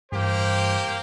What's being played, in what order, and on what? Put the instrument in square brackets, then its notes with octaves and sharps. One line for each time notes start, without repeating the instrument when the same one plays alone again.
[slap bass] G2 E3 [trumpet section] A#3 G4 C5